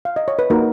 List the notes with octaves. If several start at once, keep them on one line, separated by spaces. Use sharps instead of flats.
F5
D#5
C#5
B4
A#3 D#4 F#4 A#4